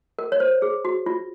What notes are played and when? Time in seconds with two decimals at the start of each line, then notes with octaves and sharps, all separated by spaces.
0.19 A#4
0.32 C#5
0.40 C5
0.62 G#4
0.85 F#4
1.06 F4